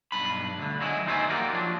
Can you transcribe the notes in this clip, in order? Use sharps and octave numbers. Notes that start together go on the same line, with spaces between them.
B1 G2 D4 B4 B5
D2 D3
F#3 G#3 B3 E4
D#2 D#4 C5 D5 E5 G#5
A#3 F#4 G4 A#4 D5
F3 F#3 D4